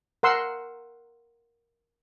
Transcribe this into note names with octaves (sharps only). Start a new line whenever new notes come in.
A#4 F#5 C6 E6